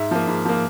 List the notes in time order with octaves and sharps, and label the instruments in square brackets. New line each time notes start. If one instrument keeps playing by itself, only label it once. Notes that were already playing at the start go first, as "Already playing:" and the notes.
Already playing: [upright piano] G#2 E5
F3 A#3
G#2
F3 A#3